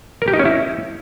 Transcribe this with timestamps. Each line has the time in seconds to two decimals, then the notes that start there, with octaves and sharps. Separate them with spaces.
0.22 A#4
0.28 G4
0.34 D#4
0.40 C#4
0.45 E4